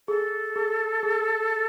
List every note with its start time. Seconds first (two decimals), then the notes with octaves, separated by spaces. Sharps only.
0.08 G#4 A4
0.56 G#4
1.03 G#4